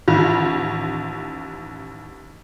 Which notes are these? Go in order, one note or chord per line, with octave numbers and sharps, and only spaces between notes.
A1 D#2 F4